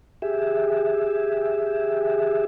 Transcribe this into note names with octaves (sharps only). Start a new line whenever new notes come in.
G4 G#4 E5